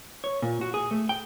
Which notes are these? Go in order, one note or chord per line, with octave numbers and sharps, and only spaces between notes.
C#5
A#2
F#4
G#4
A3
G5